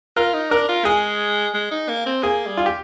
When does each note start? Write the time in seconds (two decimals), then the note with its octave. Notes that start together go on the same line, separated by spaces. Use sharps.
0.17 F4 A#4
0.34 D#4
0.51 D4 A#4
0.68 F4
0.85 G#3 G#4
1.54 G#3
1.71 D#4
1.89 A#3
2.06 C4
2.23 A#3 G#4
2.46 G3
2.57 F4
2.66 G4